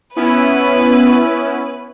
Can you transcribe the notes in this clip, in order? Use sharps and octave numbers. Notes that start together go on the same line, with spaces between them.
B3 C#4 E4 B4